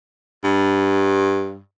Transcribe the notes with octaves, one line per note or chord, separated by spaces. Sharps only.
G2